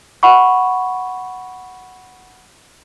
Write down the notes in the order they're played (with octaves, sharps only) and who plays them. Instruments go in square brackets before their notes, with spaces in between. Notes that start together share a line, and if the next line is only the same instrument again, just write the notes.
[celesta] F#5 B5 C#6